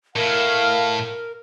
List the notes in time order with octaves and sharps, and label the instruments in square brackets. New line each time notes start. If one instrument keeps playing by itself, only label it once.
[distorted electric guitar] A2 [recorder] A#4 [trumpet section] F5